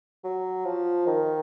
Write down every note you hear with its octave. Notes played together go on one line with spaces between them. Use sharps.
F#3
F3
D#3